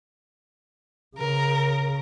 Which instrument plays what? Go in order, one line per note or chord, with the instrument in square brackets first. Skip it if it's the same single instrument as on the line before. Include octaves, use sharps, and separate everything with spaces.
[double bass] C#3 [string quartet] A#4